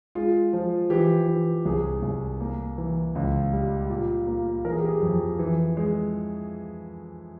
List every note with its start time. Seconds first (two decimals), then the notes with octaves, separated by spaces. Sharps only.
0.15 G#3 F4
0.53 F3
0.90 E3 G4
1.28 E3
1.65 C2 G#4
2.03 C2
2.40 A#3
2.78 E3
3.15 C#2
3.53 G3
3.90 A#2
4.27 A#3
4.65 E3 A#4
4.72 G#4
4.81 G4
4.88 G#4
5.02 F2
5.39 E3
5.77 G#3